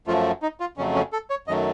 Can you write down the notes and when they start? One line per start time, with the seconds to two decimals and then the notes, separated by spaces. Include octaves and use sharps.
0.07 F#2 F3 A3 F4
0.42 D#4
0.60 F4
0.77 F2 C#3 F#3 A3 C#4
0.95 C#4
1.12 A4
1.30 C#5
1.48 F#2 D#3 F#3 A3 D#5